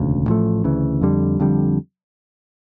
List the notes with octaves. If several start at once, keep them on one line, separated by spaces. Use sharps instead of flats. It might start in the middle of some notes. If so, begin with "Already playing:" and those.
Already playing: E1 D2 C#3
A1 A2 F3 A3
D2 C#3 E3
F2 D3 G3
F2 D3 G3